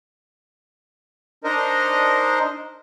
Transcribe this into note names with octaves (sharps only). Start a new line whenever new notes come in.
D4 D#4 A#4 C5 D#5